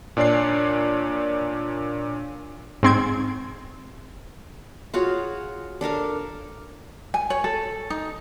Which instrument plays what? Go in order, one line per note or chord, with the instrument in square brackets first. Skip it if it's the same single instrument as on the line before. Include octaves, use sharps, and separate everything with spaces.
[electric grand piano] A#2 D4 C#5 D5 C7
[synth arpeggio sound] G#2 C4 G#6
[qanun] F4 F#4 G#4 C#5
D4 A4 A#4 F5
[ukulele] G#5
C#5
A4
D#4